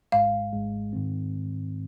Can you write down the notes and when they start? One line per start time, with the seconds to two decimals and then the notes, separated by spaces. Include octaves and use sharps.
0.12 G#1 G#2 G#3 F5
0.53 G#1 G#2 G#3
0.93 G#2 D#3 C4